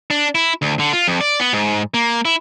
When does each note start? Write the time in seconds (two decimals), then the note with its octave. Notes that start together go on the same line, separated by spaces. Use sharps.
0.10 D4
0.35 E4
0.62 D2
0.79 D3
0.93 F4
1.08 F2
1.21 D5
1.40 B3
1.53 G#2
1.94 A#3
2.25 E4